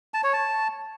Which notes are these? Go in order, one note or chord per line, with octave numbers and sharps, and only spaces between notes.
A5
C#5
A5